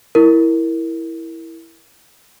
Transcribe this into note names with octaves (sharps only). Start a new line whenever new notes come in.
E4 A#4